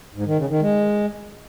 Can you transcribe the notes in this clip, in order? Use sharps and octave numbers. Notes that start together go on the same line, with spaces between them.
G#2
D#3
C#3
D#3
G#3